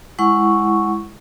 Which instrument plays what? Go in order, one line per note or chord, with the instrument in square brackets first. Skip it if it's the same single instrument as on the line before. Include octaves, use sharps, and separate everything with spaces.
[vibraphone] G#3 E4 F#5 C#6